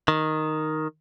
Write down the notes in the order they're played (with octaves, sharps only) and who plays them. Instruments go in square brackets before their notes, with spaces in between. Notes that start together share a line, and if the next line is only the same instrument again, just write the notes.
[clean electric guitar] D#3